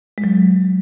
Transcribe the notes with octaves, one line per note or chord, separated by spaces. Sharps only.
G#3
F#3